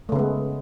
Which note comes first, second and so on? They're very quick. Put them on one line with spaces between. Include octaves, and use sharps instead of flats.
A3 C#3 B3 G#3